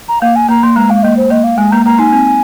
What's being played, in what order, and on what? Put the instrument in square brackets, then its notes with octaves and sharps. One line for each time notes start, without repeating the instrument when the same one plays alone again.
[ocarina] A#5
[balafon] A#3 [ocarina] F5
[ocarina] G#5
[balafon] A#3 [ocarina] A#5
[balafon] A#3 [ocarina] C6
[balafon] G#3 [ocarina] A#5
[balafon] G#3 [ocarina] F5
[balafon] A#3 [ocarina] D#5
[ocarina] C5
[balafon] A#3 [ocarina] D#5
[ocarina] F5
[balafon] G#3 [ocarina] G#5
[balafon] A#3 [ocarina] A#5
[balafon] A#3 [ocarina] A#5
[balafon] D#4 [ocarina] G#5
[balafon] C4